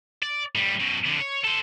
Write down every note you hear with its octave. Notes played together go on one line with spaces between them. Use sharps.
D5
A2 G3
F#2 B2
F2 D3
C#5
A4 C5